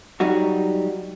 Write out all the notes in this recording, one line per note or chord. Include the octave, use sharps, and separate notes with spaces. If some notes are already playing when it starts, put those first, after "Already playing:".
F#3 G3 D#4 F#4